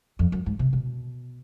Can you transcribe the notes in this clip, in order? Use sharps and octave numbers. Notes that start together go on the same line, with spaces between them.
F2
F#2
G#2
C3
B2